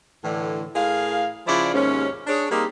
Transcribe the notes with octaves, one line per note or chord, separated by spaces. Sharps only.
A2 D3 E3
A2 G#4 A#4 F5
C#3 F3 E4 F4 D5
D#2 G#2 C3 C#4
D4 G#4 C#5
G3 A#3 C4 D#4 G4 G#4